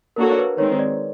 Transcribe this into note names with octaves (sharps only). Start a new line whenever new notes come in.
A#3 D4 F#4 A4 A#4 C#5
B4
D#3 G#3 C4 C#5
D5